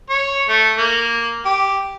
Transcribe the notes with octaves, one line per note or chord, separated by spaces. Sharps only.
C#5
A3
A#3
G4